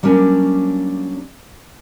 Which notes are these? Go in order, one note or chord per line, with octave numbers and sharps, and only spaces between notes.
F#3 G3 A#3 C#4 D4